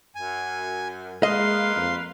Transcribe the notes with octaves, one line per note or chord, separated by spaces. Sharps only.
F#2 G#5
G#3 A#3 B4 D#5 F5 C6
F2